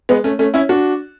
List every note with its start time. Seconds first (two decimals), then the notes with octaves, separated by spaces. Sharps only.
0.09 G#3 B3
0.24 A3 C#4
0.39 A3 C#4
0.54 C#4 E4
0.69 D4 F#4